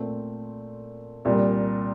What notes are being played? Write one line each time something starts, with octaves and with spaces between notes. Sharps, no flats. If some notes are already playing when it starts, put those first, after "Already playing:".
Already playing: A#2 A3 C4
C2 A#2 G3